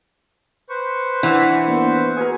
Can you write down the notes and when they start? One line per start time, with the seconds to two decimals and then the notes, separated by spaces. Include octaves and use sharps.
0.69 B4 C5 C#6
1.23 E3 D4 F#5
1.68 A#3 B3 D4
2.17 F#4 G#4 A#4 B4 G#5 C#6